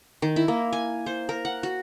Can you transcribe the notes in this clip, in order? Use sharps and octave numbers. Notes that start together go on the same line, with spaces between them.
D#3
E4
A#3
G#5
C5
A#4
F#5
F#4